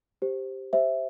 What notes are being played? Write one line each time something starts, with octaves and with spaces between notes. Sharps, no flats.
G4 C5
G4 C5 E5